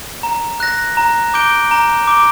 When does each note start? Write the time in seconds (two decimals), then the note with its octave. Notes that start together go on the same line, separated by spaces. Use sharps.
0.23 A#5
0.60 F#6 A#6
0.97 A#5
1.34 D6 G6 D7 G7
1.71 A#5
2.07 D6 G6 D7 G7